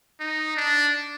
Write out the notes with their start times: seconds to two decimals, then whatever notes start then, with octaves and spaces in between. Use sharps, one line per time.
0.20 D#4
0.56 D4